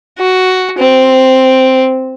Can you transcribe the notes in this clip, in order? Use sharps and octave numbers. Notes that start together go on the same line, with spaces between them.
F#4
C4